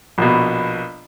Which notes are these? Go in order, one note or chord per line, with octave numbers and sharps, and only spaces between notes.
A#1 B2